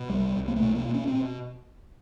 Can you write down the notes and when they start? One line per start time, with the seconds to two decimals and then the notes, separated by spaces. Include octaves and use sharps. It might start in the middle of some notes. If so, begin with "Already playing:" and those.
Already playing: B2
0.09 C2 G3
0.36 C2
0.48 A#3
0.56 A3
0.62 B2
0.75 A#3
0.88 B2
0.94 C#4
1.07 C4
1.15 B2